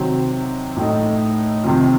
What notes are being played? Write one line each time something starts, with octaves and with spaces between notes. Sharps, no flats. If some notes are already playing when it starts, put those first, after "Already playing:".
Already playing: C3 D#3 F#3 C4
A2 A3 D#4
F2 C3 D#3